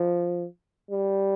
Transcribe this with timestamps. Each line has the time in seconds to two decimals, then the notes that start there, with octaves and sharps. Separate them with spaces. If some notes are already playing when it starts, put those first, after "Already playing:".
Already playing: F3
0.91 G3